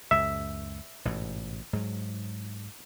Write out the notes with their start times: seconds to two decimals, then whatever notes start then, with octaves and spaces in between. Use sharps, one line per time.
0.11 C#2 F#2 E5
1.05 A1 G#2 B2
1.73 G#2 F#3